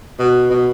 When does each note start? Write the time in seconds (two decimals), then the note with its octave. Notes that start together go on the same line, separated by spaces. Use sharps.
0.19 B2
0.50 B2